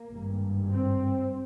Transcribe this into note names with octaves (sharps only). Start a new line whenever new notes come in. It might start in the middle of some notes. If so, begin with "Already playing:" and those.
Already playing: A#3
G#1 G2
C4